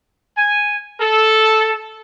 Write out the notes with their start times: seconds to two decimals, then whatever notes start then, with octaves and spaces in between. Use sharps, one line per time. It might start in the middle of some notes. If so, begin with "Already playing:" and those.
0.37 G#5
1.00 A4